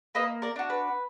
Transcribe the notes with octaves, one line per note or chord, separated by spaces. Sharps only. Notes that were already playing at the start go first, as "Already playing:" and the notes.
A#3 B4 D#5
A#4 D5
D4 F#4
B4